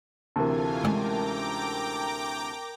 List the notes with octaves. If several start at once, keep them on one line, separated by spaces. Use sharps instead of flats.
D2 C3 E3 A3 F4 A#4 G#5 A5
G#3 C#4 G5 A#5 D6